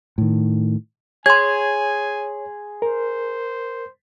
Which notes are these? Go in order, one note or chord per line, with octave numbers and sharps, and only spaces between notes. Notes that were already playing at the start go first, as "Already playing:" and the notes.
A2 D#3
G#4 C#5 G#5 C6 G#6
A#4 C5